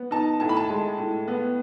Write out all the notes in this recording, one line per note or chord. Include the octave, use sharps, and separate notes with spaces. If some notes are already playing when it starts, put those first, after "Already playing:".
Already playing: B3
D#4 A5
A2 A5
B5
A5
G#3
A2
B3